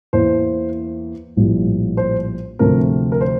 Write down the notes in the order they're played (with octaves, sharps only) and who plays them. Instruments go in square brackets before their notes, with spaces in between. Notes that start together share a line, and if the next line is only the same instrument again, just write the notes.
[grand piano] E2 E3 A#3 C5
A#1 A2 G3 A#3
C5
D2 C3 F3 A3 C4 A#4
A#4
C5